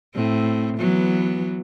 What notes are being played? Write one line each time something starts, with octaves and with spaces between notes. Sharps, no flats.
A2 C4
E3 F#3 B3